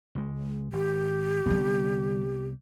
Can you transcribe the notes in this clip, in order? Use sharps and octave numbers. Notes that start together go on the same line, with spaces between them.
C#2 G#3
G#1 G4
C2 D3 G3 B3